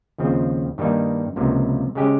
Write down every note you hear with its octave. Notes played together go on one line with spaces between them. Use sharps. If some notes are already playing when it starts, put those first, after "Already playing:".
D#2 C#3 F3 C4
G2 D#3 G3 A#3 D#4
C#2 C3 F3 A#3
C#3 G#3 C#4 G4